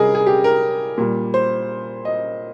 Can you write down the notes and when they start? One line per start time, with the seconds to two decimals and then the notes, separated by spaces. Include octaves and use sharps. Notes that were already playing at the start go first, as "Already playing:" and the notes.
Already playing: C3 G3 G#4 A#4 D#5
0.15 G#4
0.26 G4
0.44 A#4
0.98 A#2 G3
1.34 C5
2.05 D#5